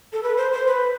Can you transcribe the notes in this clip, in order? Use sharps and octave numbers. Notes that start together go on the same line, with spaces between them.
A4
B4
C5
C5
B4